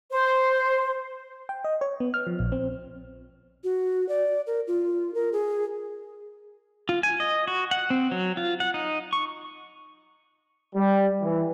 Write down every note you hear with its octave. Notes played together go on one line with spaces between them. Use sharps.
C5
G5
D#5
C#5
B3
F6
F3
A#1
C4
F#4
D5
A#4
F4
A#4
G#4
F4
G#5
D#5
F#4
F#5
C4
F#3
F4
F#5
D#4
C#6
G3
E3